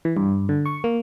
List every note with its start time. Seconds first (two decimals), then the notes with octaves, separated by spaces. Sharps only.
0.05 E3
0.17 G2
0.49 D3
0.66 C#6
0.84 A#3